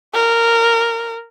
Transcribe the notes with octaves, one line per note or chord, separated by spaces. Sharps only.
A#4